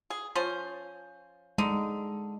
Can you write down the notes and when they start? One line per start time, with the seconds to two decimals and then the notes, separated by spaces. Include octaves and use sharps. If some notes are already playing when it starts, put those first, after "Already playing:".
0.10 G#4
0.35 F3 C#4 C5
1.58 D3 G#3 D#4